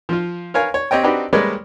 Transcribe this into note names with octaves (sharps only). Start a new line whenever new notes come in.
F3 F4
A#4 B4 C#5 F5 G#5
C#5
C4 G4 C#5 D#5 G5
C4 D4 D#4 F#4 G4 B4
G3 G#3 A#3 B4 C#5 D5